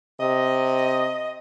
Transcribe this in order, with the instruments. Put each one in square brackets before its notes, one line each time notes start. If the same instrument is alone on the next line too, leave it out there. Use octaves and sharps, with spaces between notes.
[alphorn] C3 [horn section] D#5